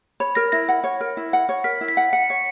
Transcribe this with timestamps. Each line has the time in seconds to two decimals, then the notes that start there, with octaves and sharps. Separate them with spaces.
0.20 C#5 B5
0.35 A#4 A#6
0.52 E4 A#6
0.68 F#5
0.84 C#5
1.01 A#4
1.17 E4
1.33 F#5
1.49 C#5
1.64 A#4 B6
1.81 E4
1.88 B6
1.97 F#5
2.13 F#5 C#7
2.30 C#5